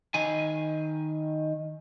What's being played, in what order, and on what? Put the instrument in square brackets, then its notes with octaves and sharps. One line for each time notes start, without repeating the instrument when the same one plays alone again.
[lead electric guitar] D#3 G#5